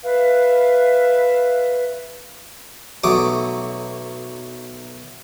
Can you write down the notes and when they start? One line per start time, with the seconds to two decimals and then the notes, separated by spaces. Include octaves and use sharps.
0.03 B4 E5 F5
3.04 B1 F#3 A3 D6 D#6